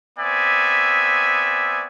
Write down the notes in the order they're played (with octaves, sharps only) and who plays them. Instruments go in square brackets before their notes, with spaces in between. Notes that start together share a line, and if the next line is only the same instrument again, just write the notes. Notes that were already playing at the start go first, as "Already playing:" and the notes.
[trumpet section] B3 C4 D5 E5 G#5